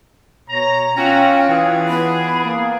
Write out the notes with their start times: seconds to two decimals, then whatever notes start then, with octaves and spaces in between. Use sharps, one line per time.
0.50 B2 C#5 A#5
0.97 A3 C#4 F4 F#4 G5
1.49 E3 D4 G#4
1.88 B3 B5
2.45 A#3